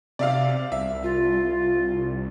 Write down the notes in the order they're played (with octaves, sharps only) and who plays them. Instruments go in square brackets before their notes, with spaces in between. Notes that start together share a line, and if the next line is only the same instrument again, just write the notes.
[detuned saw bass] C3 [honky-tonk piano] D5 E5 F5
[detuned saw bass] C2 [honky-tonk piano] E5
[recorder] F4